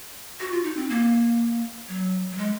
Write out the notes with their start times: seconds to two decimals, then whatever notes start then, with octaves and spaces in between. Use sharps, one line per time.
0.40 F#4
0.52 F4
0.64 D#4
0.77 C4
0.90 A#3
1.88 F#3
2.32 F#3
2.38 G#3